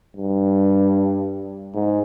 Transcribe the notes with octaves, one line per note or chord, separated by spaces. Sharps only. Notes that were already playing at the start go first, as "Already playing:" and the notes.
G2
G#2